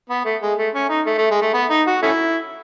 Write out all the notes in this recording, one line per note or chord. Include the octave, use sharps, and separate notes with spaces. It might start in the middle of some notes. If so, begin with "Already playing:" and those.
B3
A3
G#3
A3
C#4
D#4
A3
A3
G#3
A3
B3
D#4
F#4
A3 C#4 E4